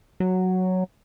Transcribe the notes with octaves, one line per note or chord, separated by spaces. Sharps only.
F#3